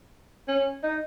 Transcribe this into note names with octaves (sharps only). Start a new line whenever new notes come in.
C#4
D#4